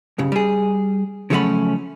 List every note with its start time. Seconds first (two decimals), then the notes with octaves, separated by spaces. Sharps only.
0.18 B1 G2 C#3
0.32 G3 G#4
1.30 C#3 F3 F#3 A3 C#4 B5